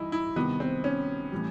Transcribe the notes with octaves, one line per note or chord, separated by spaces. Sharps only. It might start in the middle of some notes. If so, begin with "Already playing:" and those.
Already playing: E3 G3 D#4 E4
E4
C3 D#3 G3 B3
C4
C#4
A2 E3 G3